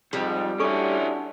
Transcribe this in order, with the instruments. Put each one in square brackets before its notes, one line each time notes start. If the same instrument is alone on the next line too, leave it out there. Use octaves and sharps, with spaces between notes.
[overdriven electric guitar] F2 [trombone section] G#2 [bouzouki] G3
[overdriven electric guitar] C#4 E4 [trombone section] D4 F#4 [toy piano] A4 C#6